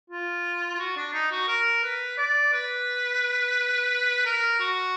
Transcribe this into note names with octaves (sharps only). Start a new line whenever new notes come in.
F4
F4
F#4
D4
D#4
F#4
A#4
B4
D5
B4
A#4
F#4